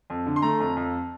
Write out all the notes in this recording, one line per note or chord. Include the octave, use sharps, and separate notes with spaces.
F2
D3
C6
A3 A#5
F2
F2